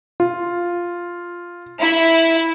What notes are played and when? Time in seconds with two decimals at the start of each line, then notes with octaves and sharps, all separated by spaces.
0.20 F4
1.80 E4